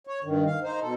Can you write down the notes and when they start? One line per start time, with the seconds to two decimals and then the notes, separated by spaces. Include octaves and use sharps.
0.07 C#5
0.24 G2 D#3
0.47 F5
0.63 D#4 C5
0.82 B2 A4